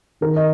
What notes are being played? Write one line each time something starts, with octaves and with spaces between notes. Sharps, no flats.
D#3 A#4
D#5